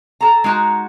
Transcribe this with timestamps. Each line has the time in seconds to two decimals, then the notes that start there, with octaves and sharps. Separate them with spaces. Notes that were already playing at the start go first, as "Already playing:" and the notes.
0.21 A4 A#5
0.44 G#3 D#4 F#4 A#5